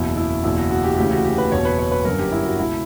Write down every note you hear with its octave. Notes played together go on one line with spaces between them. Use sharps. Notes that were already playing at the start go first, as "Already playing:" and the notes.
Already playing: F#1 E2 B2 E4
E4
F#1 E2 B2 E4
F#4
F#4
G4
D2 C#3 E3 G4
F#4
G4
B4
F#1 E2 B2 C#5
B4
C#5
B4
G1 F#2 D3 A#4
G4
E4
F#4
C#2 B2 E4